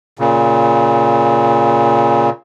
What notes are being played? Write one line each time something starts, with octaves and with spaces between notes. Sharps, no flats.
A#2 C#3